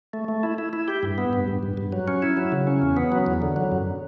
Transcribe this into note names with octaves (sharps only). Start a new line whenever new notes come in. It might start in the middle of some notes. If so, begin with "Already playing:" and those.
A3
A3
E4
E4
E4
G4
G2
B3
G2
G2
G2
G2
F#3
C#4
E4
F#3
C#3
C#4
E2
B3
F#3
E2
D3
F#3
F#2